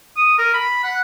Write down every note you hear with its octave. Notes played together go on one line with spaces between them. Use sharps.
D#6
A#4
B5
F#5